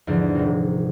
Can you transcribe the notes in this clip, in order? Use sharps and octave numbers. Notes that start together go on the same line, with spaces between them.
E2 G#2 D3 F3 D4
D#1 C3